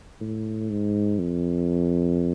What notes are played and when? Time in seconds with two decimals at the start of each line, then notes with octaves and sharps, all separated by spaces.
0.21 A2
0.70 G#2
1.19 F2